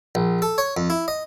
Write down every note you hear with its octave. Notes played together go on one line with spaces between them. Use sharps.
A#1
A4
C#5
F2
E4
D#5